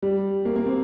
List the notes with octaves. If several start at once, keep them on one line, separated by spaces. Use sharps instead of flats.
G3
A#3
A#3
C4